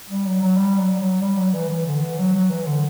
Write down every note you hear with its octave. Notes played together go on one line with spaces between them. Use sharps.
G3
F#3
F#3
G3
F#3
F#3
G3
F#3
E3
E3
D3
E3
F#3
F#3
E3
D3